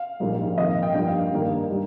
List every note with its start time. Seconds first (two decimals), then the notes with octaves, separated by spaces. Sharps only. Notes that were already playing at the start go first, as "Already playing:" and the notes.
Already playing: F5
0.20 A#1 G#2 G3 A#3
0.57 F2 D#3 A#3 D#5
0.69 F5
0.83 G5
0.94 G2 F3 A#3 G5
1.07 F5
1.32 G2 D#3 A#3
1.71 G3